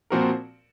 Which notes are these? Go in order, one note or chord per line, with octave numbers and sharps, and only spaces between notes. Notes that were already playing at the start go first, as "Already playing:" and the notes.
A#2 F3 C4 F#4 A#4